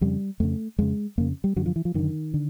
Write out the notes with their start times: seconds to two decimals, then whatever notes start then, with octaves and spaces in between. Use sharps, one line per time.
0.01 F2 C#3 G3
0.40 F2 C#3 A3
0.78 F2 C#3 G#3
1.18 F2 C#3 A#3
1.44 G3
1.56 F#2 D3 F#3
1.66 F3
1.76 E3
1.85 F3
1.94 F#2 D3 D#3
2.34 D3